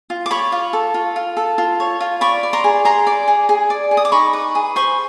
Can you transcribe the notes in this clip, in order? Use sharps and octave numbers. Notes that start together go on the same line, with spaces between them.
F4
D6
C#5 B5 C#6
F4
A4
F4
F4
A4
F4
C#5
F4
D5 B5 C#6
D5
A#5 C6
G#4
G#4 A#5 C6
D5
G#4
G#4
D5
G#4
D#6
D6
D#4 B5 C#6
B4
G#4
C5 B5 C#6